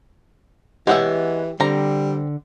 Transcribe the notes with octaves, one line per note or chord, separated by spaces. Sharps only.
E3 G#3 B3 G4 C#5 E5 F#5
D3 G3 C4 A#5